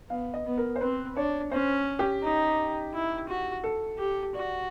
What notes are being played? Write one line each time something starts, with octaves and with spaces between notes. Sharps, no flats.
B3 F5
D#5
B3
A#4
C5
C4 B4
D4 C#5
C#4 C5
G4
D#4
E4
F#4
A4
G4
F#4 D5